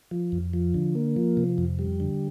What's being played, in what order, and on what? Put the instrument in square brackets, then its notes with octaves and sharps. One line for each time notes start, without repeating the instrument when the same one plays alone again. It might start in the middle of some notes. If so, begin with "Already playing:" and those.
[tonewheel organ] F3
F2
F3
D3
A#3
F3
C3
F2
G3
D3